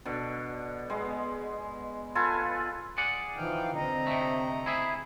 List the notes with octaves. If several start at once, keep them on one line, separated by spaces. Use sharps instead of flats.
B2 D3
G#3 B3
F4 A4 B4 G#5
G#4 D5 F#5
E3 F3 D#4 F5 G5
D3 C4 D#5 A#5
C3 A3
E4 G#4 E5